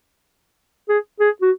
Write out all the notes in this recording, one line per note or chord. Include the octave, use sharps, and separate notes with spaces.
G#4
G#4
F#4